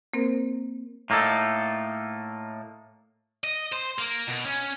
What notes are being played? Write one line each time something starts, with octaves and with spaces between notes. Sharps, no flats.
A#3 C4 A#4 C5
A2 A#3 D#4 A4
D#5
C5
A#3
B2
C#4